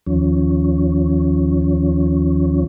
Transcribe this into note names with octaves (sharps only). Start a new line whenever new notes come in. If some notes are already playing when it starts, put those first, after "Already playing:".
D#2 F3 C#4